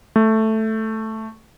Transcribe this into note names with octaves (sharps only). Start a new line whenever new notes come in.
A3